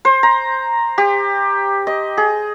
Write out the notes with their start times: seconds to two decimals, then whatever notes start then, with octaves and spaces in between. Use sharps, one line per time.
0.05 C5
0.23 A#5
0.98 G4
1.87 D#5
2.17 G#4